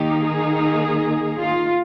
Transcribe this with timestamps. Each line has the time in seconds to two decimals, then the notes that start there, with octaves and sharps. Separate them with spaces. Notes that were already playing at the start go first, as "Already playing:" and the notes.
Already playing: D#3 A#3 D#4 G4
0.24 G#4
1.39 F4